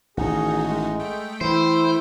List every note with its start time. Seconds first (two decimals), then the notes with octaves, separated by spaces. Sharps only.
0.17 A1 D#3 D#4 F#4 G#4
0.65 G#3
1.00 A3 G5
1.41 E3 E4 C5